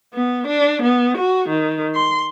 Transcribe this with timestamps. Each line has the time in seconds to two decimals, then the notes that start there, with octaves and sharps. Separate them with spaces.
0.14 B3
0.47 D4
0.82 B3
1.18 F#4
1.49 D#3
1.95 C6